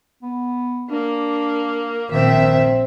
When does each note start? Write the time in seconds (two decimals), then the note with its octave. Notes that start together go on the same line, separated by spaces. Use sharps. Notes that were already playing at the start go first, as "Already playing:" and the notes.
0.22 B3
0.90 A#3 D4
2.11 A#1 D#3 C4 E5